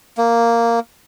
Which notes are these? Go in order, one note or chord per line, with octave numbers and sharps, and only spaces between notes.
A#3